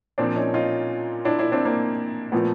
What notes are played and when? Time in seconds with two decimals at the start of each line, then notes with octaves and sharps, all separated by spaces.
0.18 A#2 F3 C4 D4
0.36 C#4 D#4
0.54 D#4 F4
1.25 D4 E4
1.39 D4 E4
1.52 C4 D4
1.65 A#3 C4
2.32 A#2 F3 A3 B3